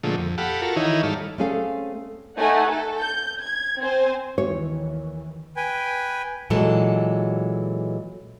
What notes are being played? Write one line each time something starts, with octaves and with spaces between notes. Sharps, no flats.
A#2 D3 F3 G#3 A3
F2
G4 A4 F5 F#5 B5
F4 F#4 A4 A#4
D#3 E3 D#4 E4 C#5
G#2 G3 A4 F5
A3 C4 C#4 G#4 A4 F5
A3 D#4 F#5 G#5
A4
G6
G#6
C4 C5 G#5
D#2 D#3 E3 C#5
B4 G5 G#5
A#2 E3 F#3 G#3 A4